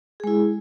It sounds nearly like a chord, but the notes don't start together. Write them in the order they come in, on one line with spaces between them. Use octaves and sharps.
G#4 G#3 E4